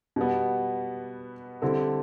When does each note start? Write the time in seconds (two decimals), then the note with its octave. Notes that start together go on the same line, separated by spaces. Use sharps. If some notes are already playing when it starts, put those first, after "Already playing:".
0.16 B2 G3 B3
1.62 D3 G3 C4 E4 A4